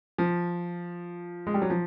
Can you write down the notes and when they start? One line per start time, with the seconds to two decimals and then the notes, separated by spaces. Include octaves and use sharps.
0.18 F3
1.47 G#3
1.54 G3
1.62 F#3
1.70 F3